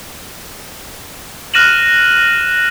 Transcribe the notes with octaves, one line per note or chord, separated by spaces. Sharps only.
F6 F#6 A#6 D#7 E7 F#7